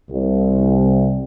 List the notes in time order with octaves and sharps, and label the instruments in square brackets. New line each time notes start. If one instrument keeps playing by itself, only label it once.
[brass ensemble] C2